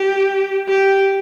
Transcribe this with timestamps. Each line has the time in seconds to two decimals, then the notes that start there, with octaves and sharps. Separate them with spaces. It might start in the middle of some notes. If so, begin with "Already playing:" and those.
Already playing: G4
0.68 G4